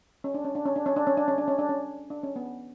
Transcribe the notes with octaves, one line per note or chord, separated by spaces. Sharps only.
C#4
D4
C#4
D4
C#4
D4
C#4
D4
C#4
D4
C#4
D4
C#4
D4
C#4
D4
C#4
B3